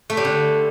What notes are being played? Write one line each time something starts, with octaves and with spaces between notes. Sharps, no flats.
A3
G3
D3